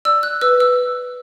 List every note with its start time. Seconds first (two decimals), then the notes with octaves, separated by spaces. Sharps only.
0.05 D5 E6
0.23 F#6
0.41 B4 E6
0.60 E6